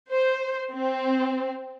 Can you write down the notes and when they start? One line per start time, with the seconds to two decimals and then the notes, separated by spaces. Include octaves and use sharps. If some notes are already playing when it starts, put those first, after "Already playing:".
0.12 C5
0.72 C4